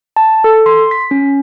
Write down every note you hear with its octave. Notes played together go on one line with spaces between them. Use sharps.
A5
A4
C6
B6
C#4